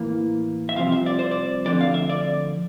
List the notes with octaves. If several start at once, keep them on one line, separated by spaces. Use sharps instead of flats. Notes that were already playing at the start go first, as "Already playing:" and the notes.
Already playing: A2 E3 A#3
E5
C2 C3 F3 C4 F5
E5
D5
C5
D5
D2 D3 F3 C4 D5
F5
E5
D5